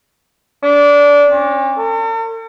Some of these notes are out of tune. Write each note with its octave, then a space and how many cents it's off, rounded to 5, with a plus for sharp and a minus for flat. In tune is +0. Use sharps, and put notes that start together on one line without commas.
D4 -20
C#4 -45
A4 +45